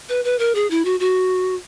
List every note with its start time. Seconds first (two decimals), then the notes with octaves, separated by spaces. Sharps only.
0.09 B4
0.24 B4
0.39 A#4
0.55 G#4
0.70 E4
0.85 F#4
1.00 F#4